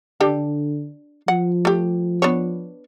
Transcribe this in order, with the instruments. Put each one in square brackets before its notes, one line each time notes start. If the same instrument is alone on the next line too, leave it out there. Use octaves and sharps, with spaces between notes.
[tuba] D3 [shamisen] D4 G4 A4
[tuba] F3 [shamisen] F#5
[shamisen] A3 G4
B3 D4 C#5